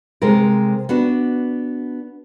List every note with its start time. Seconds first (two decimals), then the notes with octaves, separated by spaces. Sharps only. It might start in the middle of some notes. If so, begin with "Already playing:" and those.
0.22 C3 G#3 A4 A#4
0.89 B3 D4 F#4